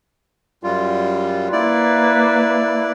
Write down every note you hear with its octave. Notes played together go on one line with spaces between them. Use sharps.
F#2 G3 F4
A#3 E4 B4 D5